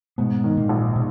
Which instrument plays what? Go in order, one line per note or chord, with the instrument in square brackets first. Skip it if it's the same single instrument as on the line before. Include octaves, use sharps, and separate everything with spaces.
[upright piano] G#2 [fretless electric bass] B2 B3
[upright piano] D#3
[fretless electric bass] A#2 A#3
[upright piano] A#1
[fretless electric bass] B2